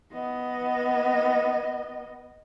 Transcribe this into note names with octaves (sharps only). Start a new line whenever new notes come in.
B3 D#5